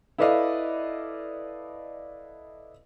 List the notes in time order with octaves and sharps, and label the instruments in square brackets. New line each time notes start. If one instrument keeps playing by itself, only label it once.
[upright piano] E4 A4 B4 D5 D#5 F5